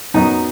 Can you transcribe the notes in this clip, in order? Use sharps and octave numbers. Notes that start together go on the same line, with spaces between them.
F#2 F#3 B3 D#4